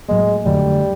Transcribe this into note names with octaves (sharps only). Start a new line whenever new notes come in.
A2 F#3 G#3 A#3
F2 D3 F#3 G3 A3